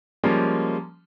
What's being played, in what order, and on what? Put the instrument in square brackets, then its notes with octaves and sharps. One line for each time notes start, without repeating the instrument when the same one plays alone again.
[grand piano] F3 G3 G#3 A#3 C#4